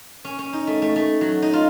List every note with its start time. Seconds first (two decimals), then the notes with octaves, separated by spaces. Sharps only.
0.25 C#4
0.39 C#4
0.53 D#4
0.67 A3
0.82 A3
0.96 A3
1.21 F#3
1.42 D#4
1.53 F4